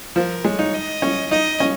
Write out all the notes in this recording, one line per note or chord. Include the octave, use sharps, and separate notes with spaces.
F3 A#4
G#3 C#5
D#4
D#5
C#4
D#4 D#5
C#4